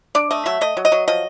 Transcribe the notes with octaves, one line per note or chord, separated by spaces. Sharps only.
D4 D5
A3 D#5
F#3 E5
A3 D#5
F#3
D#5
F#3
F3 D#5